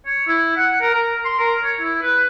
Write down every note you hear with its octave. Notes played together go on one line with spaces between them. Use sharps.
C#5
E4
F#5
A#4
A#4
C6
A#4
C#5
E4
B4